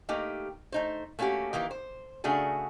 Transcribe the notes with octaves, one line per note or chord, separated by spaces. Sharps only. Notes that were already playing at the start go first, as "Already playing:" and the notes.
A3 A#3 D#4 G4
A3 D#4 C5
A3 A#3 C#4 F#4 G4
D#3 E3 A#3 G4
C5
C#3 A3 D4 F#4 G#4